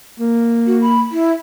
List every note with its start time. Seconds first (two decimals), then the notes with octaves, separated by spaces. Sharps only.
0.19 A#3
0.66 F#4
0.82 B5
1.11 E4